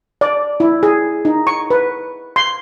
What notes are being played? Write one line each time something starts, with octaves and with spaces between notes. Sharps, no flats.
D5
E4
G#4
D#4
C#6
B4
C6